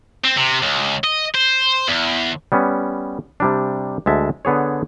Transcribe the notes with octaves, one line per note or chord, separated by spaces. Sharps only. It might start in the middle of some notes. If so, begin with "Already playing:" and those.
C4
C3
C#2
D#5
C5
E2
G3 B3 C#4
C3 G3 D4
D2 G#3 E5 A5
D3 B3 G#4 C#5